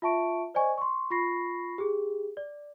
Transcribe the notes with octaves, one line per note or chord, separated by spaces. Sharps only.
F4 E5 A5 C#6 D7
C5 D5 D#5 G#5 C#6
C6 C#6
F4 B5 C#6 A#6 C7
G4 G#4
D5